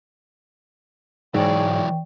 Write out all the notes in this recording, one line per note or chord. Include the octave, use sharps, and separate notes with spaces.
G#2 E3 F#3 C#5 D5 G5